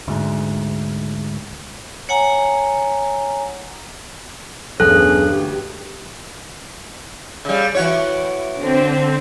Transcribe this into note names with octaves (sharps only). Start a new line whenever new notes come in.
D2 G#2
C#5 F#5 G#5 A#5
B1 E2 G2 B3 C#4 G#4 A4 F#6
D2 G4
C#3 G3
E3 F#4 C#5
D3 C4